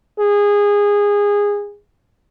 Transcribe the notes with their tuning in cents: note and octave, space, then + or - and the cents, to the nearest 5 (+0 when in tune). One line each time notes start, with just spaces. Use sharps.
G#4 -20